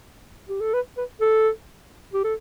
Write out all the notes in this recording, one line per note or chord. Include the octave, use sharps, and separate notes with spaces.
G4
A4
B4
B4
A4
G4
A4